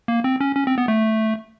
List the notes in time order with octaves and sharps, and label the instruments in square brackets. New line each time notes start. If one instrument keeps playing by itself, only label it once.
[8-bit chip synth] A#3
C4
C#4
C#4
C4
B3
A3